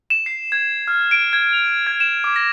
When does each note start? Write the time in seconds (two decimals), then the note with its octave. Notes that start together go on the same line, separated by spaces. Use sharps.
0.10 E7
0.26 C7
0.52 G#6
0.88 F6
1.11 D7
1.33 G#6
1.53 F7
1.87 G#6
2.00 E7
2.24 D6
2.36 A#6